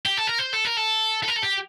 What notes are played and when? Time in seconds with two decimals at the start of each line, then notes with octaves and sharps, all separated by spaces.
0.06 G4
0.17 A4
0.27 A#4
0.39 C5
0.53 A4
0.65 A#4
0.77 A4
1.23 A4
1.28 A#4
1.36 A4
1.42 G4